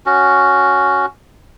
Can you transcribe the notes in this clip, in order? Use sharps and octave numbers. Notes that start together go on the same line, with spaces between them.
C#4 F#4